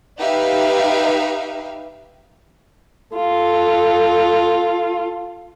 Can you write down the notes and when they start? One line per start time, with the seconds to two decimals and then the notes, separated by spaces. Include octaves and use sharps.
0.17 D#4 G4 B4 E5 F5
3.16 F4 A4